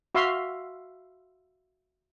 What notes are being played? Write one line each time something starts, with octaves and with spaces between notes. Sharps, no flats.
F#4 E5 F5 C6